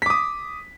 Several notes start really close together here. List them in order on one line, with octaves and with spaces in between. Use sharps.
B6 D6 D#6